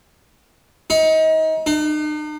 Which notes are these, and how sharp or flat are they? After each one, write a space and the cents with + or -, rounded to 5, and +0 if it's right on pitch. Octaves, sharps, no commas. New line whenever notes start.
D#4 +30
D#4 -45